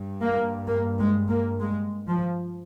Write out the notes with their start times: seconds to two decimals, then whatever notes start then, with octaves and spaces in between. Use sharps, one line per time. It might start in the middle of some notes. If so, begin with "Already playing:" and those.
Already playing: G2
0.21 A#3
0.68 A#3
0.98 G#3
1.30 A#3
1.59 G#3
2.06 F3